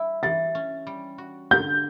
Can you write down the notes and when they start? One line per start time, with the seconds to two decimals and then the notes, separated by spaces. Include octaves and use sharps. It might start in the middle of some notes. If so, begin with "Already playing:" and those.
Already playing: G3 E4
0.23 E3 A6
0.55 C#4
0.87 G3
1.18 F#4
1.51 D3 G6